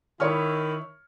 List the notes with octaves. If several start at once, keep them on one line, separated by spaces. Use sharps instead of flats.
D#3 E4 C#5 C#6 F6